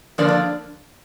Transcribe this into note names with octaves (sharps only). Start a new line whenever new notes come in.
D3 F3 A#3 D4 D5
D5